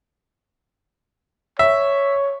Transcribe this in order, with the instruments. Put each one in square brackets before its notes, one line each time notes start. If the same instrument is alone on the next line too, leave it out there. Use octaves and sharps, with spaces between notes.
[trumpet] C#5 [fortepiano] E5